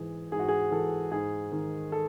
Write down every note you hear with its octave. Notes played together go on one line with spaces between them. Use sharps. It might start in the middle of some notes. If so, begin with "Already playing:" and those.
Already playing: G#2 E3 G#4
G#2 G#4
F#4
G#4
E3 A4
G#2 G#4
D#3
A4